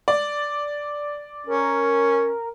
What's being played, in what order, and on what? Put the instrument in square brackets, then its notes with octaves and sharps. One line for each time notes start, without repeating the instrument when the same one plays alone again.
[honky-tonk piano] D5
[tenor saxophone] C#4 [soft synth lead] A#4